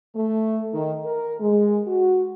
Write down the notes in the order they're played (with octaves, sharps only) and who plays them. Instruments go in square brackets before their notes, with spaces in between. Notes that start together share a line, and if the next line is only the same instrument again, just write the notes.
[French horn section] A3
D#3
A#4
G#3
F#4